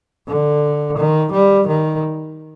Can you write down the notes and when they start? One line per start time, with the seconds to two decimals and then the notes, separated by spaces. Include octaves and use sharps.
0.28 D3
0.97 D#3
1.32 G3
1.67 D#3